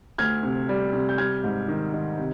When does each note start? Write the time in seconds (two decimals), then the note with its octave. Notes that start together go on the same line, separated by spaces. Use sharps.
0.18 D2 F6 G#6
0.43 C3
0.69 G3
0.93 C3
1.09 G6
1.18 G3 F6 G#6
1.44 G#2
1.68 D#3
1.93 D#3
2.18 C3